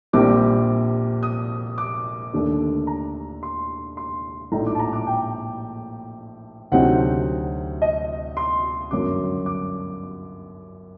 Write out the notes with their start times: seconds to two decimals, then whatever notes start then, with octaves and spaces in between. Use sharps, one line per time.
0.13 A#1 A#2 G3 C4 D6
1.23 D#6
1.78 D6
2.33 D#2 D3 A3 D4
2.87 A#5
3.43 C6
3.97 C6
4.52 A#1 A2 A3 D#4 A#5
4.67 D6
4.75 A5
4.79 A#5
4.93 D6
5.07 G5
6.72 D2 C3 F#3 C4 D#4 F#5
7.82 D#5
8.37 C6
8.91 G1 F#2 F#3 D6
9.46 D6